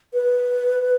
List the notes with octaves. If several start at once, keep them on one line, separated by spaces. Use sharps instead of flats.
B4